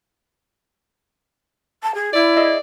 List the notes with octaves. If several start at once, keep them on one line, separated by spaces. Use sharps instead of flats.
A5
G#4
E4 D5
G#4 D#5 E5